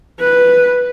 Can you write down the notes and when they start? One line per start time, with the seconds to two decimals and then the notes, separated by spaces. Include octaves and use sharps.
0.20 B4